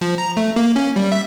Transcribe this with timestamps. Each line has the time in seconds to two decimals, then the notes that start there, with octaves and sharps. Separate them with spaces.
0.01 F3
0.18 A#5
0.37 A3
0.56 A#3
0.76 C#4
0.96 G3
1.12 E5